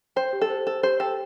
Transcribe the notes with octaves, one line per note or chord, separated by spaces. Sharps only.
C5 G5
G4
A4
C5
A4 C5
G4 C5
A4 G5